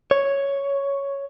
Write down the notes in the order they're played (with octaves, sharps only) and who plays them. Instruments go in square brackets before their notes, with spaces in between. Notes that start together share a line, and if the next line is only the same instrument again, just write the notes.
[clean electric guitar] C#5